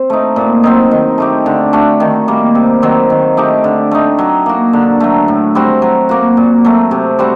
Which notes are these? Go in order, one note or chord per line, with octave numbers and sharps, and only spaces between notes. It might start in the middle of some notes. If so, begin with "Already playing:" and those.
Already playing: C4
A3 D#4
A#2
F#3 C4 D#4
D#3
A3 D#4 G4
D3
A3 D4 F#4
D#3
G3 A#3
C3
D#3 F#3 C4
D#3
A3 D#4 G4
D3
A3 D#4
F#3
A#3 F#4
D3
F#3 A3
A2
G3 C4 F#4
F#3
A#3 F#4
A#2
F#3 A3
C3
G3 C4 F#4